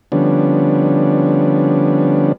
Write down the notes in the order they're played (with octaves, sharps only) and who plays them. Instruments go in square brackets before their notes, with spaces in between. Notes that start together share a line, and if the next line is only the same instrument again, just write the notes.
[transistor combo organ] D3 F3 G3 B3 C#4 D4